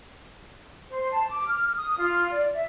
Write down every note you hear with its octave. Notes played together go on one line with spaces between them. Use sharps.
C5
A5
D6
F6
D#6
F4
D5
E5